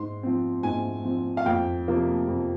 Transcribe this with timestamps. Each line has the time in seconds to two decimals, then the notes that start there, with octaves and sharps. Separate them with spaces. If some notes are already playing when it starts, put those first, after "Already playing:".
Already playing: G#2 C6
0.23 F3 C4
0.63 G#2 G#5
1.05 F3 C4
1.37 F5
1.46 F2 G5
1.88 C3 F3 A#3
2.28 F2